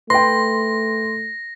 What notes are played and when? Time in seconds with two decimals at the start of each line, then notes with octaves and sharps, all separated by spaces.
0.10 A3 B4 G5 C6 A#6